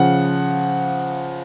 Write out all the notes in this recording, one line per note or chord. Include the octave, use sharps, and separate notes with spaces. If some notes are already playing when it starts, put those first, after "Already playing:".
Already playing: C#3 F3 F#5